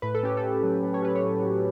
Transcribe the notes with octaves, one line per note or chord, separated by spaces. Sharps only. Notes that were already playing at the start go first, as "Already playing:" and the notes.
A2 B4
A4
C#4 G4
A4
A2
F#3
A2
C#5
C#4 B4
C#5
A2
F#3